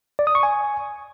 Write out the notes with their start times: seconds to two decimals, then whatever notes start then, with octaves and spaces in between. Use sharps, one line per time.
0.19 D5
0.27 D#6
0.35 C#6
0.43 G#5